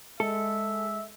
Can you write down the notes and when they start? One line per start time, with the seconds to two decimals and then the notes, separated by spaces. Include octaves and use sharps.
0.20 G#3 A4 E5